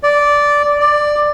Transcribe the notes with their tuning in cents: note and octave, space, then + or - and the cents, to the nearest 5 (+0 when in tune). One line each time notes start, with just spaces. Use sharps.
D5 -10
D5 +10